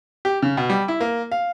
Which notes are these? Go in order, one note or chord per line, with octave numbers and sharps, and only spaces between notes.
G4
C#3
B2
G3
E4
A#3
F5